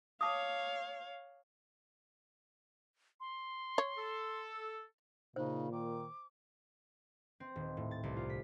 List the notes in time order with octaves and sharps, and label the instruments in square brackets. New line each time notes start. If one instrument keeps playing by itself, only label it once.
[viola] C#5 F5 [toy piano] A5 D6 D#6
[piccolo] C6
[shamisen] C#5
[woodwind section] A4
[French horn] A#2 [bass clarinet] C#3 [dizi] D#4 [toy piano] C5
[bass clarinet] D#3 [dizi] D6
[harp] C4
D#1
A2
A6
C2
F4
B6